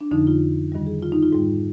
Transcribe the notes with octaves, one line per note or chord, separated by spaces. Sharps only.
D4
F2 D3 F3 D#4
F4
G2 D#3 G3
G#4
F4
D#4
F4
G#2 G3 F4